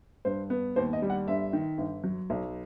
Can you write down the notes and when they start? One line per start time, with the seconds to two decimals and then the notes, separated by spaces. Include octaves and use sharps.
0.25 G2 C5
0.50 B3
0.76 D#2 C5
0.93 D#5
1.02 G3
1.10 F#5
1.28 G1 E5
1.53 D#3
1.78 G1
2.04 F#3
2.30 B1